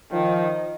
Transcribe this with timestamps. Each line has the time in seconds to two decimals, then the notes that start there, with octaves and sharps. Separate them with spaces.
0.12 D#3 F3